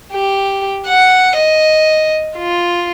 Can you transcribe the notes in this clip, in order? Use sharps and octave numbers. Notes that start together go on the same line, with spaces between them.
G4
F#5
D#5
F4